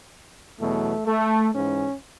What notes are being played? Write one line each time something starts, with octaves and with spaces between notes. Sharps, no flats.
E2 B2 F#3 A3
A3
G#2 E3 C#4